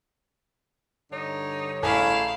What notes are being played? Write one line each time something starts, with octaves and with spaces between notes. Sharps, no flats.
G2 D3 D#4 C#5
A1 A3 E4 G#4 F5 G#5